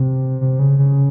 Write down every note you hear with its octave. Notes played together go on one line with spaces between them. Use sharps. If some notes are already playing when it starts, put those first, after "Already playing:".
Already playing: C3
C3
C#3
C#3